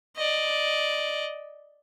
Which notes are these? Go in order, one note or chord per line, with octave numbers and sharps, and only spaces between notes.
D5 D#5